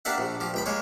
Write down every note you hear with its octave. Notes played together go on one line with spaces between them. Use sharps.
A#3 D4 G4 E5 F#5
A#1
F3 G4
C#2 G5 B5
G#3 A#3 C#5